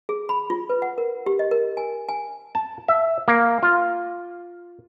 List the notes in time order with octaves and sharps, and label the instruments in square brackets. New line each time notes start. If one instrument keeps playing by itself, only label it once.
[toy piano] G#4
B5
F4
B4
F#5
A#4
G4
D#5
A#4
G#5
G#5
[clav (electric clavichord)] A5
E5
A#3
F4